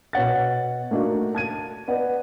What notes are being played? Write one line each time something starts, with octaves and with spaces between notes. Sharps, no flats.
B2 C#5 F#5 A6
A3 A#3 D4 D#4 F#4
A5 G#6 D#7
B3 D5 D#5 F#5